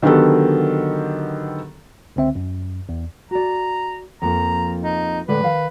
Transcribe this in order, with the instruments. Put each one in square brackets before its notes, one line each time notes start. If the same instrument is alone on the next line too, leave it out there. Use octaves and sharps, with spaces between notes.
[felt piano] D3 D#3 F#3 B3 G4 A4
[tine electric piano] C#2 D3 C4 E5
F#2
E2
[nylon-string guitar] F#4 D5 [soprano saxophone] A#5
[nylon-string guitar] F2 F3 A#3 [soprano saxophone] A#5
[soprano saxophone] D#4
[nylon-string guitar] A2 D3 G#3 [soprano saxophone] B4
[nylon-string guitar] D#3 F5